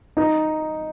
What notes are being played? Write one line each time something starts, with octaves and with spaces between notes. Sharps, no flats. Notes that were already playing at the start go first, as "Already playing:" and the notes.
D#4